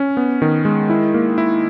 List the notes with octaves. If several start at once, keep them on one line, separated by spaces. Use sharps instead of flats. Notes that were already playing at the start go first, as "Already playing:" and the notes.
Already playing: C#4
B3
D#3
G#3
E4
A#3
E4